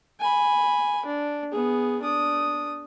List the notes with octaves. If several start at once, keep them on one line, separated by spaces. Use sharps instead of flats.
G#5 B5
D4
B3 G#4
D4 D#6